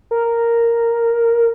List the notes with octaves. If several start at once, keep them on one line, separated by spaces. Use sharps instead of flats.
A#4